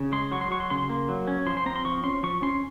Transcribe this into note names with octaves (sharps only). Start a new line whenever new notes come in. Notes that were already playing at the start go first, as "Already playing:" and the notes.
Already playing: C#3
G#3 C6
F#3 C#6
C6
F#3 C#6
C6
C#3 C6
A#3
F#3
C#4
F3 C6
C6
C4 A#5
C6
F3 C#6
C#4 C6
F3 C#6
C#4 C6